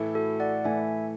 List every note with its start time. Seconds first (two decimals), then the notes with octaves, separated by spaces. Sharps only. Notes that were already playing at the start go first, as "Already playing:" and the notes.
Already playing: A2 E3 A3 E4
0.15 F#4 A4
0.40 D5 F#5
0.64 A2 E3 A3 E4 E5 G#5